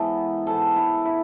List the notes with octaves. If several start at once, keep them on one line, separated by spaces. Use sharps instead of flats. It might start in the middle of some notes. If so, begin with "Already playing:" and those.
Already playing: G#2 E3 B3 D#4 A4
G#2 E3 B3 D#4 A4
E4
E4